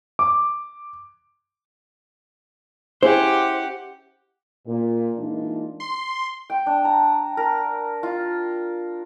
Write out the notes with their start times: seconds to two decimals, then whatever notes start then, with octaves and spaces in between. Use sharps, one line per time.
0.19 D6
3.03 C#4 E4 G4 G#4 C5 F#5
4.67 A#2
5.18 E3 G#3 A#3 D4 D#4 F4
5.80 C6
6.50 G5
6.66 D4
6.85 A#5
7.37 A#4
8.03 F4